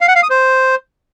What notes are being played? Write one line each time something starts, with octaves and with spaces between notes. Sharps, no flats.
F5
F#5
F5
D#6
C5